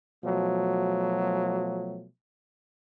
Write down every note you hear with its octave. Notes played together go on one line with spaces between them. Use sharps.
B2 F3 F#3 A3